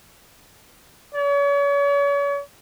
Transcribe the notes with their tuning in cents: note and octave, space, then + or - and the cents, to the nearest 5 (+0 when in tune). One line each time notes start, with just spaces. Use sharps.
C#5 +40